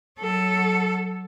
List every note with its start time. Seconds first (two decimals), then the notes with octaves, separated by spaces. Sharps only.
0.20 F#3 A4